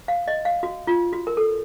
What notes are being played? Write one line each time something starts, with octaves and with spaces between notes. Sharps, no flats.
F5
D#5
F5
F#4
F4
F#4
A#4
A4